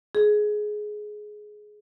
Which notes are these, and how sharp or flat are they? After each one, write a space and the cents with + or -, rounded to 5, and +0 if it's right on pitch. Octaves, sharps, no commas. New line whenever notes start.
G#4 +15